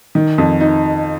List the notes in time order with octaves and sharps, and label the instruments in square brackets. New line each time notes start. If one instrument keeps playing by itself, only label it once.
[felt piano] D#3
F2
D#4